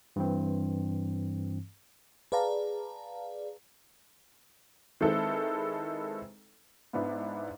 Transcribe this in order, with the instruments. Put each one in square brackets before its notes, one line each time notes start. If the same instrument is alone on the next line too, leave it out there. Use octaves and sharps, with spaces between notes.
[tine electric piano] G2 E3 C4
[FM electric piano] G#4 B4 D5 F5 A5 A#5
[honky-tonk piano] D#3 G#3 C4 E4 A4 B4
G#2 B3 D4 E4